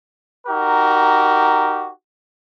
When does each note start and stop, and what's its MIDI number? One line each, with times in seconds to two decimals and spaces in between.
0.47 1.90 63
0.47 1.90 66
0.47 1.90 67
0.47 1.90 70